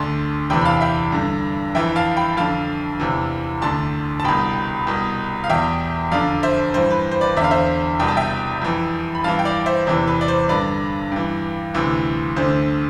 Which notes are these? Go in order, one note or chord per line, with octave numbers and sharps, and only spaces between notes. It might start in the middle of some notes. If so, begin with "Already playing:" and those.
Already playing: D2 D3 A5 C6
E2 C3 E3 G5 B5
B5
F5 A5
E5 G5
G2 D3
F2 E3 E5 G5
F5 A5
G5 B5
F2 D3 F5 A5
E2 C3 E3
D2 D3 A5 C6
A5
C2 B2 G5 B5
C2 B2
F5
E2 B2 E5 G5
F2 D3 D5 F5
C5 E5
G2 E3 C5
B4
C5
B4 D5
E2 D3 E5 F5
C5 E5
C2 B2 G5
A5
E5 G5
F2 E3
B5
G2 E3 F5 A5
G5
D5 F5
C5 E5
E2 C3 E3 C5
B4
D5
C5
G2 D3 B4 D5
G2 E3
D2 C3 E3
D2 D3 C5